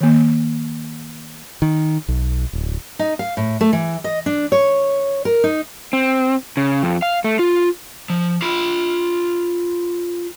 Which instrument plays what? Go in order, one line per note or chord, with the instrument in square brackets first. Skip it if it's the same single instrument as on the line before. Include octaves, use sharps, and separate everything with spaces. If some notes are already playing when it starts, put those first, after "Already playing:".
[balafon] D#3 A#3
[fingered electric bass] D#3
B1
D1
[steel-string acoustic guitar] D#4
F5
A2
A3
E3
D#5
D4
C#5
A#4
D#4
[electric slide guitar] C4
C#3
F2
F5
A3
F4
[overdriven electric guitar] F3
F4 B5